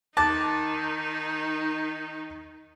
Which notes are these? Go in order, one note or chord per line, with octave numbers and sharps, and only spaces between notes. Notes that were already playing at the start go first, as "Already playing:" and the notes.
D#3 D#4 A5 D6 F#6 A6